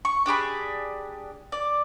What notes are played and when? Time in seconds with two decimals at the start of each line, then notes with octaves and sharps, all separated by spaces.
0.05 C#6
0.26 D4 G4 G#4 B5
1.52 D5